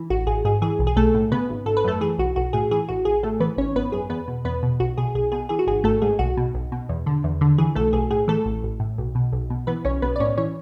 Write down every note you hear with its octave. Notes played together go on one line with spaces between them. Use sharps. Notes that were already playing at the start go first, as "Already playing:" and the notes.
Already playing: E3
A1 F#4
A1 G#4
G#2 G#4
E3 G#4
B1
G#4
B1 A3 A4
A2
C#3 B3 B4
G#1
G#1 A4
B4
F#2 A3 A4
E3 G#4
B1 F#4
B1 F#4
A2 G#4
E3 G#4
A1 F#4
A1 G#4
A2 A3 A4
E3 B3 B4
G#1 C#4 C#5
G#1 B3 B4
F#2 G#4
E2 B3 B4
B2
E2 B3 B4
B2
B1 F#4
B2 G#4
B1 G#4
B2 G#4
E3 G#4
F#4
G#1 G#4
G#1 A3 A4
G#2 G#4
B1 F#4
B2
B1
B2
E2
D3
E2
D3
E3 G#4
B1 A3 A4
B1 G#4
A2 G#4
E3 A3 A4
A1
A1
A2
B1
B2
B1
B2
E3 B3 B4
B1 C#4 C#5
B1 B3 B4
D5
A2 C#4 C#5
E3 C#4 C#5